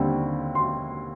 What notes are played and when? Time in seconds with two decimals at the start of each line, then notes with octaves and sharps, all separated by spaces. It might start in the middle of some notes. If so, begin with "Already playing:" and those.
Already playing: D#2 D3 G3 C4
0.55 C6